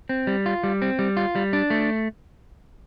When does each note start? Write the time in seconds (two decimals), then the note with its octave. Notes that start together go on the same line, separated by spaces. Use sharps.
0.09 C4
0.27 G3
0.46 F4
0.63 G3
0.82 C4
0.99 G3
1.17 F4
1.35 G3
1.53 D4
1.70 A3